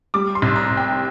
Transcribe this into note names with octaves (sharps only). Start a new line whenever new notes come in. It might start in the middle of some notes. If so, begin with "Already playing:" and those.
G3 D6
C6
C2
A#5
C3
G5